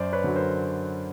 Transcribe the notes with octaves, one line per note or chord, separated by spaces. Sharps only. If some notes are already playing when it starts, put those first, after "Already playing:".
Already playing: F#2 C5 D5
B4 C#5
D3 F#3
A#4 C5